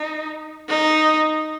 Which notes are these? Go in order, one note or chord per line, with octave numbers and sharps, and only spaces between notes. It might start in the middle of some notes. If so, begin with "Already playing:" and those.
Already playing: D#4
D#4